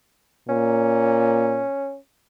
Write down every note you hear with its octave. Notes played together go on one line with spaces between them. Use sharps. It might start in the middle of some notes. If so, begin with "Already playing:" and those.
A#2 C#4